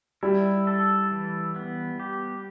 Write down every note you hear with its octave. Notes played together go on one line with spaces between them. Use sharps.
G3 E4
A4
E3
B3
G4